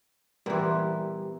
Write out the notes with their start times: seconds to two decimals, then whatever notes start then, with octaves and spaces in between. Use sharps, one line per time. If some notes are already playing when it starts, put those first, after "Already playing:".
0.46 A#2 E3 G3 B3 G4